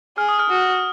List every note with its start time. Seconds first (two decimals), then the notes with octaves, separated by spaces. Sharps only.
0.17 G#4 F6
0.29 D#6
0.39 F6
0.49 F#4